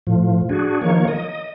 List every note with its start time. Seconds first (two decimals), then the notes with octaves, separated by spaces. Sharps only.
0.07 A2 F3
0.49 D4 F#4 G#4
0.81 D#3 F3 A#3 C#5
1.08 D#5